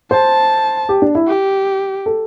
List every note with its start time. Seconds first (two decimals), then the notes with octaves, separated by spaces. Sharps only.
0.11 C5 A5
0.89 G4
1.02 D4
1.15 E4
1.28 G4
2.06 A4